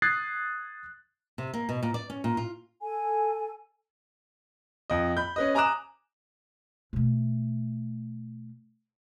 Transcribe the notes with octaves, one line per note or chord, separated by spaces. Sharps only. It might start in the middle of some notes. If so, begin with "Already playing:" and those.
D#6 F#6 G#6 A6 C7
C3
A#3
B2
A#2
D5
C#4
A#2
F4
A4 G#5
F2 D#5
B5 G6
C#4 B4 D#5
G#5 A#5 D6 D#6 F#6 E7
B2 A3